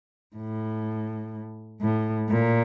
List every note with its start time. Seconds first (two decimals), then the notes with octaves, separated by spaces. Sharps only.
0.36 A2
1.81 A2
2.29 A#2